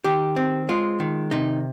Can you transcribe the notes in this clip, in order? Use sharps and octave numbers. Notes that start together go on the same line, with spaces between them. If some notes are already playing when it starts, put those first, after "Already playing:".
D#3 G4
C4
G#3 F4
D#3
C3 D#4